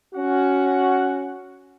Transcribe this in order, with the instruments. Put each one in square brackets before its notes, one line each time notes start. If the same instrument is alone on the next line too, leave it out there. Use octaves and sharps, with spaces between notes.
[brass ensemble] C#4 F#4 F#5